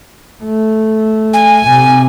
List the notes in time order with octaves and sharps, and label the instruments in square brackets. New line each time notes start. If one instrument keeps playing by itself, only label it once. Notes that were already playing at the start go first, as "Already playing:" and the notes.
[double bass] A3
[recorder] G#5
[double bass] C3